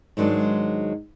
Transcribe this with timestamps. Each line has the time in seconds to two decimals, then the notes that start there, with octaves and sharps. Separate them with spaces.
0.17 G#2 D#3 F#3 G#3 D4